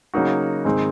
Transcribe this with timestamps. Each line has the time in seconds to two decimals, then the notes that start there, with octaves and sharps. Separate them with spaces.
0.14 C#3 F#3 A#3 D#4 F#4
0.65 G#2 D#3 G#3 C4 D#4